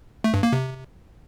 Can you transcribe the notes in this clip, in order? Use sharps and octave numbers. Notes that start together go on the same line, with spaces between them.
A3
G2
A#3
C3